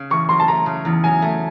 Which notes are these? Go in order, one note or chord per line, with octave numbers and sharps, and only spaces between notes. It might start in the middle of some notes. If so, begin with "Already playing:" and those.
Already playing: C#3
E2 C#6
F#3 C6
A5
A3 A#5
C#3
E2
F#3 G#5
A3